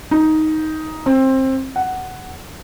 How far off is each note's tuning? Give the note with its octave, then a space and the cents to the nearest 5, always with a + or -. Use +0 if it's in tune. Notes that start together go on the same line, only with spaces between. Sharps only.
D#4 +10
C4 +20
F#5 +5